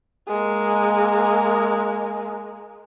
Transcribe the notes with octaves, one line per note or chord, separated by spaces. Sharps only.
G#3 A#3